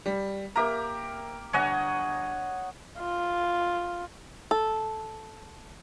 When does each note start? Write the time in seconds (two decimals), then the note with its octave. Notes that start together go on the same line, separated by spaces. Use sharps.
0.06 G3
0.56 A#3 G4 A#4 E5 A#5
1.53 G1 C#5 D#5 F#5 G#5 F#6
2.99 F4
4.51 A4